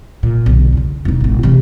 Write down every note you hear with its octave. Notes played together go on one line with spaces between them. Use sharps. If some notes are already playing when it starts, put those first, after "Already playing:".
A#2
B1 D3
E2 C#3
E1 D#4
E1 A1
C3 E3